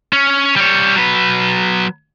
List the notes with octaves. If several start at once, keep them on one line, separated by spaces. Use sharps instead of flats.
C#4
G3 C#5
F#3 B4